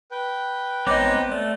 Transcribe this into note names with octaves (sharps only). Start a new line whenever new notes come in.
B4 G5
A1 G#3 B3 C4 D#4 C#5 D#5 D6
A3 D5